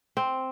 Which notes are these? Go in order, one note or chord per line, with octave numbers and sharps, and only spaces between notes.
C4